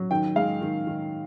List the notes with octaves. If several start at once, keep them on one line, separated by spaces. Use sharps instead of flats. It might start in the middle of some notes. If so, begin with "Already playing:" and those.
Already playing: F#3
D#3 G5
G#3 F5
D#3
D#3